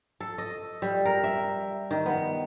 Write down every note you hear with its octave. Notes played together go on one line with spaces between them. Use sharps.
A4
D#5
G3
A#4
E5
D#3
B3